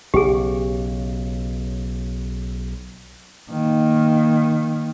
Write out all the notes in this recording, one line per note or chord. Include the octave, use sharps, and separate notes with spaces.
B1 C#3 G4 G#4
D#3 A#3